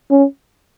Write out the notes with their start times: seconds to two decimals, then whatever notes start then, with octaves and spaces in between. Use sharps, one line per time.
0.11 C#4